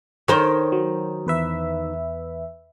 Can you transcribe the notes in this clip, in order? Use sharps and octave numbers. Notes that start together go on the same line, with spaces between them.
D#3 A#4 C5 C#5
F#3
E2 B4 E5